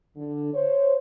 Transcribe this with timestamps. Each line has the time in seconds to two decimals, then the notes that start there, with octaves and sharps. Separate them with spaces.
0.17 D3
0.54 C5 C#5